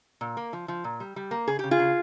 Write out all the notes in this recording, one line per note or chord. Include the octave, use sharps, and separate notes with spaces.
A#2
A#3
F3
F3
A#2
G3
G3
A#3
C#3 G#4
C#3 G4
F4 G#4
C#3